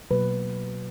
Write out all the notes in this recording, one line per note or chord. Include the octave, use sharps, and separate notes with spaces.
B2 F#3 A#3 B4